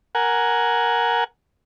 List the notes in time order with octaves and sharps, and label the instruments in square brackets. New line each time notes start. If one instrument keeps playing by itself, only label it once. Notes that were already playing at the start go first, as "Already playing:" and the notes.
[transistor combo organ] A#4 F#5 G#5